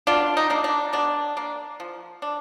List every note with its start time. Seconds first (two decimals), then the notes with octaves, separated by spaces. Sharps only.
0.07 B2 D4 F4
0.37 D#4
0.50 A#3 D4
0.64 D4
0.93 B2 D4
1.37 A#3 D4
1.80 F3
2.22 D4